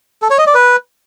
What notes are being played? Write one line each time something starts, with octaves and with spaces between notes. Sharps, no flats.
A4
C#5
D#5
D5
B4